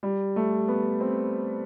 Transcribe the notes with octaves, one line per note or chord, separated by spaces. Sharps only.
G3
A3
B3
C4